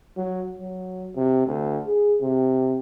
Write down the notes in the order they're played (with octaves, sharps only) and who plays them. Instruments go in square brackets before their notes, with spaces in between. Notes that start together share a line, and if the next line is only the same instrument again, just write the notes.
[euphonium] F#3
F#3
C3
D2
G#4
C3